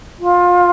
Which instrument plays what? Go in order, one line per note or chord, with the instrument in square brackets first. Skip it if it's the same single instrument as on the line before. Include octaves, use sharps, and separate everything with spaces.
[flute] F4